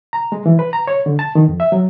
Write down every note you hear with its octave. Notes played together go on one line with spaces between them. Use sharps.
A#5
G#3
E3
B4
A#5
C#5
D3
A5
D#3
F2
E5
F#3